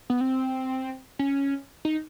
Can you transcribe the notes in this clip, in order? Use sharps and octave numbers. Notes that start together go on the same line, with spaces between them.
B3
C4
C#4
D#4